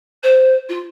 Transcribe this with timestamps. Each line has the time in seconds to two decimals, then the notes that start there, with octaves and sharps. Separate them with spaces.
0.23 C5
0.69 F4